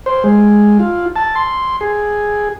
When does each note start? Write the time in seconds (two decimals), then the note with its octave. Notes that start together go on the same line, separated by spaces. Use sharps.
0.06 C5
0.24 G#3
0.79 F4
1.16 A5
1.35 C6
1.81 G#4